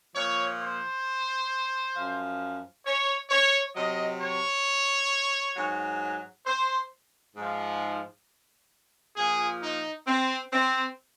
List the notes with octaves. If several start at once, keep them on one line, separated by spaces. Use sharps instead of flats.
A#2 F3 C#5
C5
F#2 F3
C#5
C#5
C3 F#3 D#5
C#5
G#2 F#3
C5
G#2 F3
A#2 F3 G#4
D#4
C4
C4